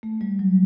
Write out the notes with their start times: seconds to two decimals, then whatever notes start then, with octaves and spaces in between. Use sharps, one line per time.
0.03 A3
0.21 G3
0.39 F#3